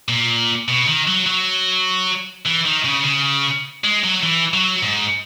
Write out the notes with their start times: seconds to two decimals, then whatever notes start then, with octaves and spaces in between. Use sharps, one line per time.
0.08 A#2
0.68 B2
0.87 D#3
1.07 F#3
1.27 F#3
2.45 E3
2.65 D#3
2.85 C#3
3.05 C#3
3.84 G#3
4.04 F#3
4.23 E3
4.54 F#3
4.83 G#2